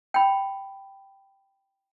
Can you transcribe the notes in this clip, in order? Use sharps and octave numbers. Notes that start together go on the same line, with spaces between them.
G5 B5